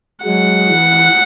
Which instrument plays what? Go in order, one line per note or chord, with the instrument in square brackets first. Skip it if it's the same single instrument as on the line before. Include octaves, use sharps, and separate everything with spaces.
[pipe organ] F#3 G#3 [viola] F#5
[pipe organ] E3